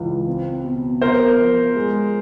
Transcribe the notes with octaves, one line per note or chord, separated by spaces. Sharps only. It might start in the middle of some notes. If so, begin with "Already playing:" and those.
Already playing: C#2 E3
C4
B2
B3 A#4 C5
F3
G#3